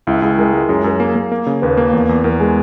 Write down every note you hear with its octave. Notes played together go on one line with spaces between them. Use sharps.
C#2 E4
C#2 G#4
G#3 A#4
G#3
F#2 G#4
F#2 A#4
A#3
A#3
A#3
C#3
D#2 B4
A#3
E2
E2
E2 A#4
G#3 G#4